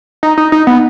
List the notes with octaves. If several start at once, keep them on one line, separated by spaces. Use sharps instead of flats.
D#4
D#4
D#4
B3